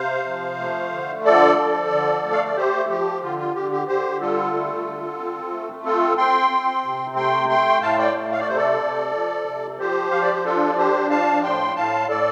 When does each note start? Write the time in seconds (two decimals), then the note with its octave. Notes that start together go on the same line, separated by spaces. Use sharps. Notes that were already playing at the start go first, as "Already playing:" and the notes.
Already playing: C3 C5 F5
0.26 F3
0.59 A3
0.92 D3
1.25 F3 A4 D5
1.58 F3
1.90 D3
2.24 A3
2.32 F5
2.44 D5
2.56 A3 G4 C5
2.89 F3 G4
3.22 D3 F4
3.38 F4
3.55 D3 G4
3.71 G4
3.88 D3 G4 C5
4.21 G3 F4 A4
4.53 A3
4.87 D3
5.19 C4
5.52 A3
5.84 C4 F4 A4
6.17 C4 G5 C6
6.50 C4
6.84 C3
7.16 A3 G5 C6
7.49 A3 G5 C6
7.82 A2 F5 A5
7.98 D5 G5
8.15 A3
8.32 F5
8.39 D5
8.48 C3 C5
8.56 A4 D5
8.80 C3
9.13 F3
9.46 C3
9.79 F3 G4 C5
10.11 F3 F5
10.22 D5
10.33 C5
10.44 D4 F4 A4
10.69 D5
10.77 D4 G4 C5
11.10 F3 F5 A5
11.43 A2 G5 C6
11.76 A2 F5 A5
12.09 A2 A4 D5